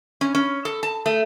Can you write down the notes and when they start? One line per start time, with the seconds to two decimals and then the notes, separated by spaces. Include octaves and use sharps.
0.21 C#4
0.35 C#4
0.65 A4
0.83 A5
1.06 A3